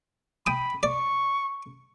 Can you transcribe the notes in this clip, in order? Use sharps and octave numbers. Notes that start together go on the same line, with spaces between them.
G5 B5 D#6
D5 C#6